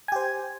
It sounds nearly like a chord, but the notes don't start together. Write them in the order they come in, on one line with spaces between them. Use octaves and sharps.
G#5 G4 C5